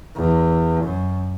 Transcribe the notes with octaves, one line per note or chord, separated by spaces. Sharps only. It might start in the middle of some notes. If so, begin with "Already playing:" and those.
E2
F#2